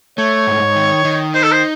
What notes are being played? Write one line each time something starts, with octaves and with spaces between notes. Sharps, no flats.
A3 C#5
G#2
D#3
D#3
D#4 C5
A4
C5